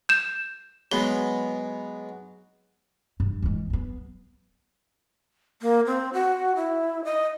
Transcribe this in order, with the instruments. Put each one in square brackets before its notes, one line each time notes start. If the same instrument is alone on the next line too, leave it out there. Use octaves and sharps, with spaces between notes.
[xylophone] G6 E7
[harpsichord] F#3 G#3 B3 [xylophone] G7
[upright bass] G2
E3 G#3
F#3 B3
[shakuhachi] A#3
C4
F#4
E4
D#5